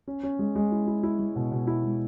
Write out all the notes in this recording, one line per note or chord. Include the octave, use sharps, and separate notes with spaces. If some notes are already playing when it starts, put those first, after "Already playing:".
C#4
C#4
G#3
G#3
E4
E4
E4
G#3
B2
B2
E4
G#3